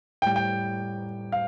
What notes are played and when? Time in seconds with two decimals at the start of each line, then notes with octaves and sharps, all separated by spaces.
0.22 A2 G5
0.26 G3
0.36 G5
1.32 F5